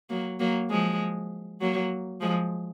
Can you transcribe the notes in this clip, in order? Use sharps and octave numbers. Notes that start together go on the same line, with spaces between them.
F#3 A#3
F#3 A#3
F3 G#3
F#3 A#3
F3 G#3